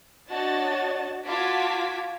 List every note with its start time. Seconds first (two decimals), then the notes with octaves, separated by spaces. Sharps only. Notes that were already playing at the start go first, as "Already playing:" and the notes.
0.29 D4 F#4 C#5 D#5 A5 A6
1.24 F4 F#4 A5 D6 G#6 B6